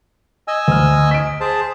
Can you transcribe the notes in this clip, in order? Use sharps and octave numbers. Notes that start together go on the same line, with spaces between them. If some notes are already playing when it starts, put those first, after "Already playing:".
D#5 G#5 E6
D2 F6
B6 D7
G#4 C5 A5